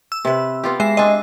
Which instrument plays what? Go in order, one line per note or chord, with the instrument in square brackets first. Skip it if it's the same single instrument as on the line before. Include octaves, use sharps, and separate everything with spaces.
[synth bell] E6
[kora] C3 B4
B3 F4 G4
[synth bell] G#3 E5 C7
[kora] C4 D4 [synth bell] D#5 G#5